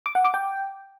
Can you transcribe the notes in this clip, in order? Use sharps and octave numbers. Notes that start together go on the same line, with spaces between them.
D6
F#5
D6
G5